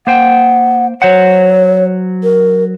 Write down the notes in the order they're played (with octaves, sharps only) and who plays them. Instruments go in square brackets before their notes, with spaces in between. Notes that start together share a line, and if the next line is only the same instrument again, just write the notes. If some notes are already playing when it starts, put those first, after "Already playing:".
[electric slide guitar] A#3 C5 G5 [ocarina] F#5
[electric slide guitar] F#3 C5 F#5 [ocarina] C#5
[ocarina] A#4